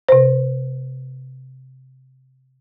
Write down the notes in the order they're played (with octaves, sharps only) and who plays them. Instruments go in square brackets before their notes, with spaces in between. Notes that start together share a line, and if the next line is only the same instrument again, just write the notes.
[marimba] C3 C5